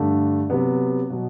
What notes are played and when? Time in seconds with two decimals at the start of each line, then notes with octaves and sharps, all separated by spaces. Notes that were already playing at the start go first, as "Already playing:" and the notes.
Already playing: G2 D3 A3 D4
0.50 C3 F#3 B3
1.10 B2 F#3